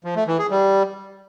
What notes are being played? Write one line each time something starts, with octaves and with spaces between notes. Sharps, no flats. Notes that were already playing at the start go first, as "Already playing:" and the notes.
F3
A3
E3
G#4
G3